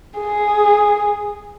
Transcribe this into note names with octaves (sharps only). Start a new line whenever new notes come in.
G#4